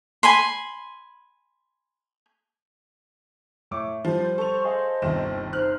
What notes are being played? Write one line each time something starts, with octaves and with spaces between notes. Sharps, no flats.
G#5 B5 C6
A2 C#6 D6
F3 G3 C5
A4 C#6 F7
G#4 D#5 F5 C6
G1 D#2 C3 E7
D#4 C5 F6 F#6